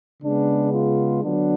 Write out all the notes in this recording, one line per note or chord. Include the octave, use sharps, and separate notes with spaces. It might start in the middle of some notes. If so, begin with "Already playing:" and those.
C#3 G#3 B3 D4
F4
D3 F#3 B3 D4